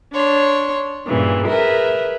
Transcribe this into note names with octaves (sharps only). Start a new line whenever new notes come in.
D4 C#5 C6
G2 A#2 C#3 E3
G#4 A#4 B4 E5